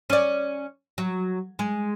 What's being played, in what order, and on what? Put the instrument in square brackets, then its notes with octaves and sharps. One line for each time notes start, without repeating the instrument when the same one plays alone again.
[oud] C#4 D5
F#3
G#3